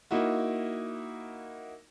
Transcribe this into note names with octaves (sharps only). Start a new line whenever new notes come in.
A#3 D#4 E4 F#4